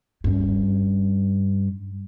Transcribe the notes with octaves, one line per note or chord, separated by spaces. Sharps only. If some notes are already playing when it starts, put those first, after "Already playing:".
G2 C#4